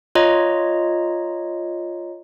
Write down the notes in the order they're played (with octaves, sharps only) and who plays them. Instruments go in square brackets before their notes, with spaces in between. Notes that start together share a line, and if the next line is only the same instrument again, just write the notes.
[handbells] F4 C#5 D#5 A#5